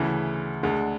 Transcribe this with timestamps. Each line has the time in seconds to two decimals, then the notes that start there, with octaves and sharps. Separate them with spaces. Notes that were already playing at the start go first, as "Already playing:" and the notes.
Already playing: D2 C#3 E3
0.63 D2 D3 G#3